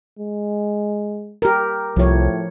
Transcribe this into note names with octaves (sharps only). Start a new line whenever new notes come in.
G#3
G4 A#4
C2 A2 F3 C#5